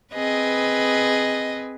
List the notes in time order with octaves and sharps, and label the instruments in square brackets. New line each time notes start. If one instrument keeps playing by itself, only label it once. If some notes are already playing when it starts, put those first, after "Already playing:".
[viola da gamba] C4 G#4 B4 [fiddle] D#5